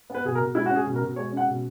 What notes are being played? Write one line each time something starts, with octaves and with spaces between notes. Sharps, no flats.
B3 B4
B2 G#4
A#4
B2
G#3 E4
F#4
C#4
G#4
B2
A#4
B2
G#3 C#5
C#4
F#5
B2